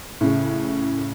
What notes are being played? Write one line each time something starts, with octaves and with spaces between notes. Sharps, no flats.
A2 C#3